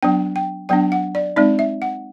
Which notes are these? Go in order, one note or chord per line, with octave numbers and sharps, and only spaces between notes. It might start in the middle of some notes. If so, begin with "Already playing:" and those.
F#3 B3 D4 G5
G5
F#3 B3 D4 G5
F#5
D5
G#3 C4 D#4 D5
E5
F#5